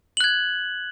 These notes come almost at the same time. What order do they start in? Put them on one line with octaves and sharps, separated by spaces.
F#7 F#6 G#6